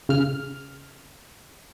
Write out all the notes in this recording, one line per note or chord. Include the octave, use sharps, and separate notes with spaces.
C#3 F6